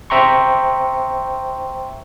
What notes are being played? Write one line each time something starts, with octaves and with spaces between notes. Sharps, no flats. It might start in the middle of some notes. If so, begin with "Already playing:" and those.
C5 E5 G5 A#5 C6 C#6